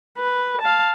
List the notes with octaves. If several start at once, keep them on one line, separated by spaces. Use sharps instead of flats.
B4
F5 A5